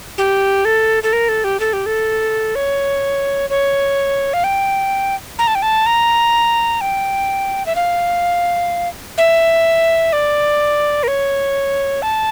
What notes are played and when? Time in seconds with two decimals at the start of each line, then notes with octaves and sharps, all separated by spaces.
0.18 G4
0.65 A4
1.03 A4
1.13 A#4
1.29 A4
1.44 G4
1.60 A4
1.73 G4
1.86 A4
2.55 C#5
3.50 C#5
4.34 F5
4.44 G5
5.39 A#5
5.47 A5
5.55 G5
5.62 A5
5.86 A#5
6.81 G5
7.66 E5
7.76 F5
9.18 E5
10.13 D5
11.03 A#4
11.08 C#5
12.02 A5